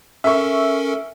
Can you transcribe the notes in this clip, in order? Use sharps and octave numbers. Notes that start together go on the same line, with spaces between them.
C#4 A4 A#4 E5 C#6